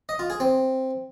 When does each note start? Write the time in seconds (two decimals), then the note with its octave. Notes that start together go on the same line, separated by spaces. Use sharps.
0.09 D#5
0.19 F4
0.30 G#4
0.40 C4